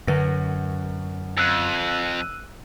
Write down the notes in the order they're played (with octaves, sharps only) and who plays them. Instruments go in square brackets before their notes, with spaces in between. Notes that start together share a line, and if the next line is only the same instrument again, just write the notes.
[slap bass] F#2 [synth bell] D3 B4 A#6
[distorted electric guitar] F2 [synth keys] E6 F#6 D#7